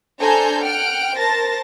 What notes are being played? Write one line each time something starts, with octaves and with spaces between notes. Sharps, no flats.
D4 A4 C5 G#5 A#5 G6
F#5 G5 F6 D7
A#4 C5 A5 A6 A#6